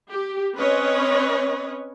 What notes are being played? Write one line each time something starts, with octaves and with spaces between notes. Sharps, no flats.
G4
C4 C#4 B4 C#5 D#5